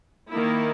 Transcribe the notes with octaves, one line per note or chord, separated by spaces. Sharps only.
D#3 A#3 E4